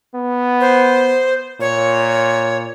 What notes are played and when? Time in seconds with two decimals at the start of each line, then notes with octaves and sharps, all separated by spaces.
0.15 B3
0.61 C5
1.60 A#2 C#5